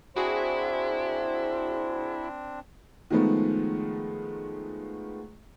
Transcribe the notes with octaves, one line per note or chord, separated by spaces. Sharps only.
C4 D4 E4 F#4 G#4 C5
D#3 F3 G#3 A3 B3